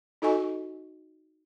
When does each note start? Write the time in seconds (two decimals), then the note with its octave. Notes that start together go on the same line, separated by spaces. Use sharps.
0.22 D#4 F#4 A4 D#5 G#5 C#6